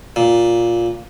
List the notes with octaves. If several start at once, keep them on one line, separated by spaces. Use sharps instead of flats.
A#2